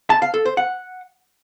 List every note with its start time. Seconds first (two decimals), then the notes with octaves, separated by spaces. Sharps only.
0.10 A5
0.22 F5
0.34 A4
0.45 C5
0.57 F#5